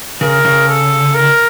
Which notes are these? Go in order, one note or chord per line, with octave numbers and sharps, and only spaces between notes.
C#3 A#4
C#3
A4
A#4